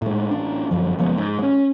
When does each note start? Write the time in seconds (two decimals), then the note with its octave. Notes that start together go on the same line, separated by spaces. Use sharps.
0.02 A2 G#3
0.31 A1 D4
0.71 G1 F#2 F3
0.99 F#1 F3 G#3 B3
1.18 G#2
1.39 G#3 C#4